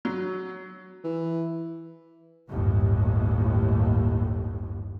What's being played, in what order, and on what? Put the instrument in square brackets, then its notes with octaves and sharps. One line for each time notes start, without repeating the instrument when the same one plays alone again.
[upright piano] F#3
[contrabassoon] E3
[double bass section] G1 D#2 A2